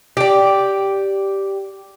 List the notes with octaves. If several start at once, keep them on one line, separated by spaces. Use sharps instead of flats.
G4 D5